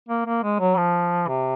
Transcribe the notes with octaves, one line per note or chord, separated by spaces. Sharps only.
A#3
A#3
G#3
F#3
F3
C3